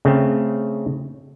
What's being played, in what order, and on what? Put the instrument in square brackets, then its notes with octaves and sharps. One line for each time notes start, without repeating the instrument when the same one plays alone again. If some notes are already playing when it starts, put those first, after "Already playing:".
[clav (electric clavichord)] C#3 A3 C4